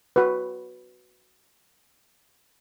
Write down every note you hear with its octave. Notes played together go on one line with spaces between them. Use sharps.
F#4 B4